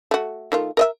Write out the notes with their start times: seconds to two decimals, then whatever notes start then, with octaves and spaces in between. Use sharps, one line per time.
0.11 A3 F#4
0.52 D#3 A3 F4
0.77 A#4 D#5 E5